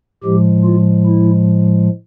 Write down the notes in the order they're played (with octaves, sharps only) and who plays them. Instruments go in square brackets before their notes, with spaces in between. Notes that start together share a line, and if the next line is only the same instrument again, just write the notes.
[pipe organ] A2 F3 G#3 G4
F4
E4